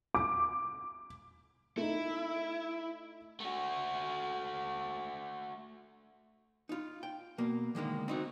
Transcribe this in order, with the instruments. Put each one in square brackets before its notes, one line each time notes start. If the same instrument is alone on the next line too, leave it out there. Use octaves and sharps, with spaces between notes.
[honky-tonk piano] D6
[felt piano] A3 D#4 [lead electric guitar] E4
[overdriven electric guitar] A3 F#4
[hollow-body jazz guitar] D#4 F4
G5
B2 A#3
D3 D#3 G#3 A#3
C4 D#4 F#4